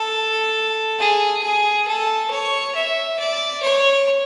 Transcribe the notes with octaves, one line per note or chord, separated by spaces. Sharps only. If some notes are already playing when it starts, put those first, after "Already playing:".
Already playing: A4
G#4
G#4
A4
C#5
E5
D5
C#5